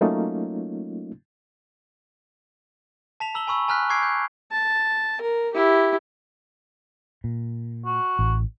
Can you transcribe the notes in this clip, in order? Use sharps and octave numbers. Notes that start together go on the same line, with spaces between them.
F#3 A3 A#3 C#4 D#4 F4
A5 B6 F7
A#5 E6 F#7 G7
G#5 B5 C#6 E6
G#5 A#5 F6 F#6 B6
C#6 D6 E6 G#6 C7 D7
G6
A5
A#4
E4 G4
A#2
F#4
A1